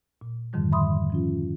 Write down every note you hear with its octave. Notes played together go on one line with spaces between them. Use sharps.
A#2
F2 G#2 D3 D#3 F3 G3
E5 B5 C6 D#6
F3 C#4 F4